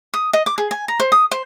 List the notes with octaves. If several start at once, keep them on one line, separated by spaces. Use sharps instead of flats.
D#6
D#5
D6
G#4
G#5
A#5
C5
D#6
C5